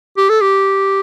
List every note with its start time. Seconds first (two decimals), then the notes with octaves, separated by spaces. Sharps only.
0.18 G4
0.29 A4
0.41 G4